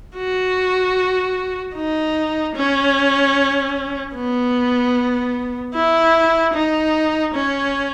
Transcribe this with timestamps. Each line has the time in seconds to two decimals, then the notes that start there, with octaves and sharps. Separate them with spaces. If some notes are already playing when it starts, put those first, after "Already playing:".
0.16 F#4
1.75 D#4
2.55 C#4
4.15 B3
5.74 E4
6.53 D#4
7.34 C#4